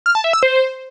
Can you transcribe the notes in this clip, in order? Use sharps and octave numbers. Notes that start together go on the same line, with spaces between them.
F6
A5
E5
E6
C5